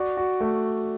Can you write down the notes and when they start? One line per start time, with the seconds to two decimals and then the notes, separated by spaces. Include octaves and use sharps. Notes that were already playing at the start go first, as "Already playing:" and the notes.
Already playing: F#4 D5
0.17 F#4
0.40 A3